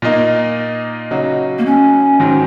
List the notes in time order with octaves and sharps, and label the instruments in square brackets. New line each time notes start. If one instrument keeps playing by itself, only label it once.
[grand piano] A#2 A#3 D#4
C#3 F#3 D#4 F#4
[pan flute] A#3
C#4
[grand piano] G#2 D#3 F#3